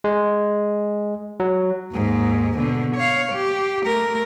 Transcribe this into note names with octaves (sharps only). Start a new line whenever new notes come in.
G#3
F#3
D#2 G#2
B2 D3
C#5 F5
G4
A3 A#4